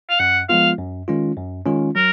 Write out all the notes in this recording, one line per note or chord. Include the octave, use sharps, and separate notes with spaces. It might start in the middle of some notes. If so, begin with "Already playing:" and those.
F5
F#2 F#5
F3 G#3 B3 F4 F5
F#2
D#3 G#3 C#4 F4
F#2
D#3 G#3 C#4 F4
F#3 A#4